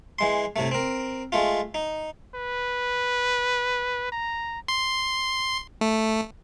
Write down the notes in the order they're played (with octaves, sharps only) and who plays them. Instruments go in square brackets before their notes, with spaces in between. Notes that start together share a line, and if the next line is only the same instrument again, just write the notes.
[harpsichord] E3 G#3 C6
A2 C3 A3
C4 A#4
G#3 A3 F4
D#4
[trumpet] B4
A#5
[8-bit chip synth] C6
A3